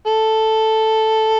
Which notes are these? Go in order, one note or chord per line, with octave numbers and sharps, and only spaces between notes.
A4